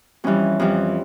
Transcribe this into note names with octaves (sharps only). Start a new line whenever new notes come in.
F2 E3 G3 C#4
F2 E3 G3